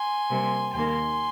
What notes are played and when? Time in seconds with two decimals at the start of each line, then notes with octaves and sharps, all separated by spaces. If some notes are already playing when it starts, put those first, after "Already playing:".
Already playing: G#5 C6
0.30 C3 G3 A#3
0.74 D#2 D#3 A#3 G#5 C6